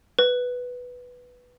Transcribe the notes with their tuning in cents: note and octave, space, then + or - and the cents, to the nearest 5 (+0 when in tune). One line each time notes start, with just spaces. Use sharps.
B4 +0